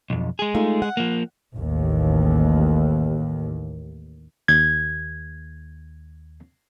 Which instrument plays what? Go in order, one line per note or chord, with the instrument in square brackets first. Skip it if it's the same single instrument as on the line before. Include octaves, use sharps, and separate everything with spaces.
[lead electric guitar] B1 F2
G#3 G#4
[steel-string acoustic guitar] A3 D#4 F4
F#5
[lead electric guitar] F3 A#3
[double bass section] A1 D#2
[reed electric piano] D#2 G#6